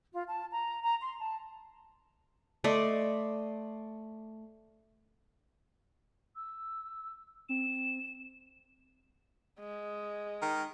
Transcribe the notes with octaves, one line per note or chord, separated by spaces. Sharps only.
F4
A5
A#5
A#5
C6
A5
A3 D5 D#5 C6
E6
C4 E7
G#3
D#3